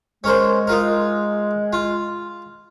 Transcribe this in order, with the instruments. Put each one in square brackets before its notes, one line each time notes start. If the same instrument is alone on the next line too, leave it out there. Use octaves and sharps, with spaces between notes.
[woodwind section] G#3 [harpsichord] C#4 A#4 C5
[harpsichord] D#4 F4 A#4
F4